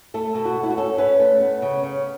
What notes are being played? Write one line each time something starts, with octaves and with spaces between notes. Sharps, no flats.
A3 A4
B2 A4
F#4
A3
E4
F#4
C#4 A4
C#4 B4
A3 B4
B3
C#3
C#3